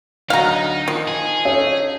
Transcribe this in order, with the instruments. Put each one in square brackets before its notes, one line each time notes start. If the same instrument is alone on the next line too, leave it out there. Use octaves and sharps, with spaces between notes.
[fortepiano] D2 F#3 C#6 [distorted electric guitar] D#4 [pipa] F5 A#5
[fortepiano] D#3 [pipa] F3
[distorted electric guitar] G#4
[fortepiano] C#4 D#4 A4 [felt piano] C#5